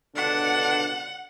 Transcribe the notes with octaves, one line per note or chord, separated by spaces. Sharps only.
C#2 B2 D3 D4 F#5